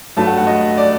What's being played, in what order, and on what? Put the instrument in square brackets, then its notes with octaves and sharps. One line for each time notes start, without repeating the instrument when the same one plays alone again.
[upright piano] G2 F#3 A3 A5
F#5
F#5
D#5
D5